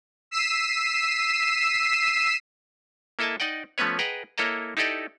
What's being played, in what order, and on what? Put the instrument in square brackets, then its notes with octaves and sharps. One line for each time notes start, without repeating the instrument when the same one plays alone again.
[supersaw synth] E6 B6 C7 D#7 E7
[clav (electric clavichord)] A#3 E4 A4 D#5 E5 A5
D#4 D5 D#5 F#5 G5
F3 A3 B3 C#4 B4 C#5
G#4 B4 D#5 F#5 G5 A#5
A#3 E4 A4 C#5 D#5 A#5
D#4 E4 G4 A4 D5 D#5